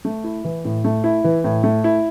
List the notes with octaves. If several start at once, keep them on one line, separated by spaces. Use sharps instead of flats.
A3
E4
E3
A2
A3
E4
E3
A2
A3
E4